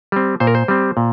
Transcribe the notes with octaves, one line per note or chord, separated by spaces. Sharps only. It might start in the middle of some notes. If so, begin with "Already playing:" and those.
G3 C4
A#2 C5
A#4
C5
G3 C4
A#2